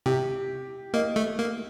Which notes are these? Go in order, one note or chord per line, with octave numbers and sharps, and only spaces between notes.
C3 G4
A#3 D#5
A3
A#3